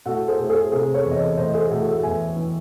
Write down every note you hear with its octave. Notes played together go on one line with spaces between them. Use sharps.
A2 F#4 A4
G#4 C5
A2
G#4 C5
C3 G#4 C5
A4 C#5
E2
D#5
A4 C#5
A2 C5 D#5
G#4 C5
A2 F#4 A4
F#4 A4
E2 E5 G#5
E3